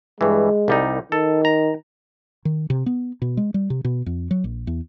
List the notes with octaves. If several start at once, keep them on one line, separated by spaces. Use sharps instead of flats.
G2 E3 G#3
C2 G3 D#4
D#3 A4
A#5
D#3
C3
B3
B2
G#3
G3
C3
B2
F2
F#3
A#1
E2